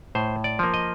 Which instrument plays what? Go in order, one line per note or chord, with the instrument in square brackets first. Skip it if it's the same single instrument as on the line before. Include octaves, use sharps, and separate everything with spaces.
[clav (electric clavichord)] A2 C5
D5
F3 A#3
D#5